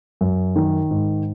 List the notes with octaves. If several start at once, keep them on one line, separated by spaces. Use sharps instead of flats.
F#2
D#3
G#2